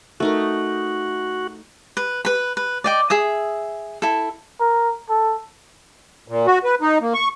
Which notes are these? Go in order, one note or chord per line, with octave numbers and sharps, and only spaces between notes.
A3 D#4 F#4 A#4
B4
B4 B5
B4
D5 D#5 G5
G#4 E5 D#6
E4 A4
A#4
A4
A#2
F#4
B4
D#4
A#3
C#6